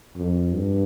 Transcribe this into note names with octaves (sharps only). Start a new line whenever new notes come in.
F2
G2